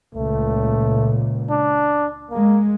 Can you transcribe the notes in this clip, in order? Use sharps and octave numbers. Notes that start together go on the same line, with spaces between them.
C#2 A#2 A3
D4
G#3 A#3